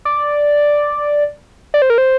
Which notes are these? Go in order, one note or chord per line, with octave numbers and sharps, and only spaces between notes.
D5
D5
C5
A#4
C5